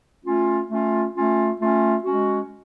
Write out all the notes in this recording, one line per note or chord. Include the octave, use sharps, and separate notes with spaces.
A3 C#4 F4
A3 C#4 F4
A3 C#4 F4
A3 C#4 F4
G#3 C#4 F#4